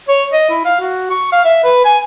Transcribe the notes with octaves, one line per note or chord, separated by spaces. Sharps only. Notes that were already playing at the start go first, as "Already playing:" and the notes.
C#5
D#5
E4
F5
F#4
C#6
F5
E5
B4
G#5